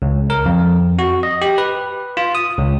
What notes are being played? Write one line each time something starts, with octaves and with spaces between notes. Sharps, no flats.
C#2
A#4
F2
F#4
D#5
G4
B4
F4
D#6
C#2